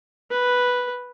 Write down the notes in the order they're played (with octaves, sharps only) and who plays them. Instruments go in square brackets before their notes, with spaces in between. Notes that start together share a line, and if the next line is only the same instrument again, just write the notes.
[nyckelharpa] B4